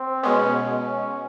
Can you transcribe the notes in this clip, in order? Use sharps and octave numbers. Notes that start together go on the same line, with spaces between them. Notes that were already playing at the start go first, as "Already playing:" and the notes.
Already playing: C4
B2 G#3 B3 C#4
C#4